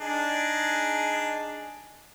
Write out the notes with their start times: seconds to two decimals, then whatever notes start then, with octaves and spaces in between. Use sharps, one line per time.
0.01 D4 D#4 G#4